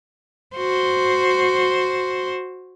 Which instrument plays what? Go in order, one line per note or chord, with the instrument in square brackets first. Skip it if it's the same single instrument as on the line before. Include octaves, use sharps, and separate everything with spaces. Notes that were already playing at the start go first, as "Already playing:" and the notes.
[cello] F#4 C5